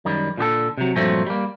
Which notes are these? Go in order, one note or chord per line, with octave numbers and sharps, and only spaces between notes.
F#2 D#3 G3
A#2 D3 G4 A4
C3 F#3
G2 A#2 F3 F#3 A3 C4
G3 A#3